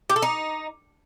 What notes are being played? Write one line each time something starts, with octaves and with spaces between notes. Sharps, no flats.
G4
A4
D#4